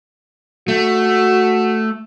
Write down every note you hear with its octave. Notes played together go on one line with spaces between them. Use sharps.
A3 F#4